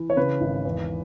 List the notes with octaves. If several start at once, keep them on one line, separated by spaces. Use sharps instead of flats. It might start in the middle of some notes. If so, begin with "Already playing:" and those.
Already playing: E3
C#5
C#3 B4
G#1
E2